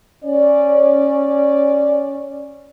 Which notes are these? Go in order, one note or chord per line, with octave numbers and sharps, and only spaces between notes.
C#4 D5